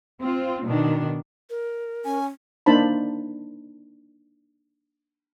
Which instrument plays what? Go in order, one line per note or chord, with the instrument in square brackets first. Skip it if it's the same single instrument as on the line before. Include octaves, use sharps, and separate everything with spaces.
[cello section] C4 F4
B2 D#3 D4
[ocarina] A#4
[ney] C#4 [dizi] G#5
[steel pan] A#3 D4 D#4 C5 A5 B5